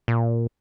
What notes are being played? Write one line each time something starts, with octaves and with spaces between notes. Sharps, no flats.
A#2